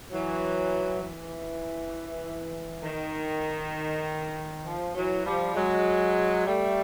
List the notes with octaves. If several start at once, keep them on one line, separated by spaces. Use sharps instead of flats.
E3 F#3
E3
D#3
F3
E3 F#3
F3 G3
F#3 G#3
G3 A3